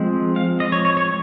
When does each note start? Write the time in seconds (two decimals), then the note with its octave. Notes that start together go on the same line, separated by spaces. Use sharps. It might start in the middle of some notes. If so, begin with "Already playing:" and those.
Already playing: F3 G#3 C4
0.36 F5
0.60 D#5
0.72 C#5
0.85 C#5
0.97 C#5